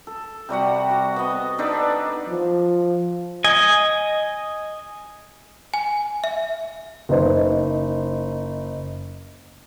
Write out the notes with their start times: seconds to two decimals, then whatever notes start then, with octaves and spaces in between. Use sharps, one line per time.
0.07 A4
0.49 C3 G3 F#4 F#5
0.90 F#4
1.16 B3 D#5
1.58 D4 D#4 A4 B4
2.29 F3
3.44 D#5 G#5
5.74 G#5
6.24 E5
7.09 F#1 D#4 C5